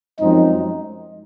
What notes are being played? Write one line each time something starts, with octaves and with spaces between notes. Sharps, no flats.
F#2 F3 G#3 C4 D#4